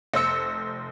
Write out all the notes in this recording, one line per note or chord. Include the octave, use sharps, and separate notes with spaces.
F1 C5 E6 C#7